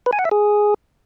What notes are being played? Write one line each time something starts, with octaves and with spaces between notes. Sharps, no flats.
B4
G#5
F#5
E5
G#4